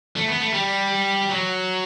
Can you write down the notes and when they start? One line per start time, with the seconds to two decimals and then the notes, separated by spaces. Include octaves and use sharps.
0.16 A3
0.28 B3
0.40 A3
0.53 G3
1.29 F#3